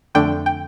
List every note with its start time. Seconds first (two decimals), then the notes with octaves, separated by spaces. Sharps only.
0.15 F2 D3 A3 D4 G5
0.46 G5